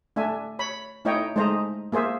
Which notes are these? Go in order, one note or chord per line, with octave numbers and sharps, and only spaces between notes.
A3 D4 E5 G#5
C#5 B5
A3 D#4 E4 C#5 D#5 G5
G#3 A3 D#4 C5 D#5 A#5
A#3 G#4 C5 E5